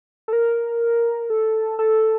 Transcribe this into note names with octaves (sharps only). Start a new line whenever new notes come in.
A4
A#4
A4
A4